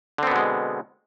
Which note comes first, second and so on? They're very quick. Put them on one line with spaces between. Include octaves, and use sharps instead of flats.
D3 C4 B3 B2 G#3